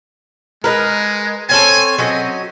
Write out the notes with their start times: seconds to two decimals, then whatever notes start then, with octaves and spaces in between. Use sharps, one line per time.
0.64 G#3 A#4 B4 D#5
1.49 C4 C#4 A4 G#5
1.98 F#3 C4 C#4 D#5